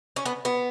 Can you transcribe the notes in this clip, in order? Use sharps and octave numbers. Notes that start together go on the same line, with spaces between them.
C#4
B3
B3